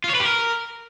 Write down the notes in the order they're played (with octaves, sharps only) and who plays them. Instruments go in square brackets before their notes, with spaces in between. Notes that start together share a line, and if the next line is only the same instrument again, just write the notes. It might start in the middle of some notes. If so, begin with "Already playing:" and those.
[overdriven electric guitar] F4
C#5
B4
G4
A#4